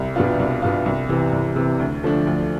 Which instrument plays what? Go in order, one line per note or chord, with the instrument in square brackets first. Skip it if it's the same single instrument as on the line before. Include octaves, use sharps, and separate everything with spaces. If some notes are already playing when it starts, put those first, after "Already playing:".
Already playing: [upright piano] C2
B2 B3 D4 F4
C2
B2 B3 D4 F4
C2
C3 E3
C2
C3 E3
D2
D3 F3 A3 D4
D2